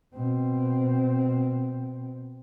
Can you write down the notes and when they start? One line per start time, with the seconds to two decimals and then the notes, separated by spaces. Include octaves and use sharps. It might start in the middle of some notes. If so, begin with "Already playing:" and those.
0.14 B2 C4